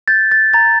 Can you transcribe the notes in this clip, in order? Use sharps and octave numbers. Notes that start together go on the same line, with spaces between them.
G6 A6
A6
A#5 A6